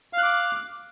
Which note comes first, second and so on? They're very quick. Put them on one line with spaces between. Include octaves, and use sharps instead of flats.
F5 F#6 D6